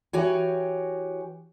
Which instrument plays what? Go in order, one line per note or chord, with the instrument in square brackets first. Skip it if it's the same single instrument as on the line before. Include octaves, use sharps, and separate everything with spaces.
[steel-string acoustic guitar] E3 F#4 G4 C#5 G#5